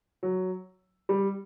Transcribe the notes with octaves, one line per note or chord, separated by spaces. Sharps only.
F#3
G3